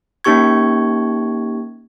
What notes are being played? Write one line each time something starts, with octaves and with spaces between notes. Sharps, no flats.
A#3 C#4 D#4 G4 C#6 G#6